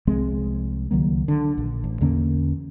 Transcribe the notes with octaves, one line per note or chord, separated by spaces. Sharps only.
C2 F3 G#3 C4
C#2 D#3 F#3 A#3
D3
A#1
A1
E2 D3 A#3 C#4